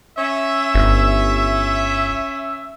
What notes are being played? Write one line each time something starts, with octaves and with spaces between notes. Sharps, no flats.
C#4 E5
G1